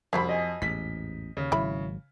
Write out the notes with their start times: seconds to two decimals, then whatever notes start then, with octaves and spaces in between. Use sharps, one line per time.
0.13 C2 F2 F3 F#3 C4 B5
0.29 D#5 G#5
0.62 A1 E2 G#2 B6
1.37 D#2 C#3
1.52 G#1 F#3 E4 B5